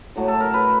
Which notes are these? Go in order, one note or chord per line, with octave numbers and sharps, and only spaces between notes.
A2 F#3 A3
A4
A#4
B4